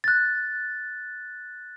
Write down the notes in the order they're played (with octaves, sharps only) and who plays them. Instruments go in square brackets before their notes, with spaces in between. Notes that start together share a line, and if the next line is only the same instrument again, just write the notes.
[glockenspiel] F#6 A6